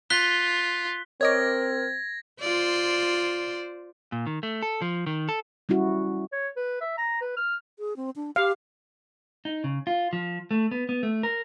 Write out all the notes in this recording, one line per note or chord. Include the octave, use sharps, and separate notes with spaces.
F4 F#6 B6 G7
C4 A#4 C#5 D#5 D6 G#6 A#6
F4 C5 D5
A#2
D#3
A3
A4
F3
D#3
A4
G3 C#4 E4 F#4
C#5
B4
E5
A#5
B4
F6
G#4
C4
D4
G4 F5
D#4
C#3
F4
F3
A3
B3
B3
A3
A#4